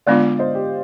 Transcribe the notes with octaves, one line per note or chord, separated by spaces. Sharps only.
D3 G#3 B3 D4 F4 D5 F5
C5 D#5
G4